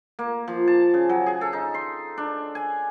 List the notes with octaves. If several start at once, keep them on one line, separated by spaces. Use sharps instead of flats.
A#3
F3
A5
C#3
F#3
G#4
A4
D#4
C6
D4
G#5